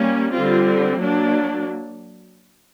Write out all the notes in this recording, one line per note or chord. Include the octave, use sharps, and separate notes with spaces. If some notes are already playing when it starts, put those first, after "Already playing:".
Already playing: G3 A#3 C#4
D3 G3 C4 F4
F#3 A#3 D4